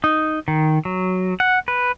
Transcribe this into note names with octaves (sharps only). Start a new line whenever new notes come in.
D#4
D#3
F#3
F#5
B4